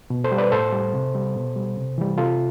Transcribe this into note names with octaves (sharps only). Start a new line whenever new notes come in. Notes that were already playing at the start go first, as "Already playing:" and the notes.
B2
A4 C5
G3
B4 D5
A2 A4 C5
G3
C3
G3
B2
G3
C3
E3 G3
C3 F4 A4